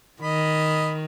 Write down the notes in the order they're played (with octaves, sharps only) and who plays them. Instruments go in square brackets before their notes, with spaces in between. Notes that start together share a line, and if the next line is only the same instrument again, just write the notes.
[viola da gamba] D#3 [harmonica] D#5 B5